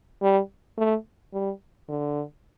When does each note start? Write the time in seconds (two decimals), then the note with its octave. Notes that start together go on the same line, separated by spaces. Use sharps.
0.22 G3
0.78 A3
1.33 G3
1.89 D3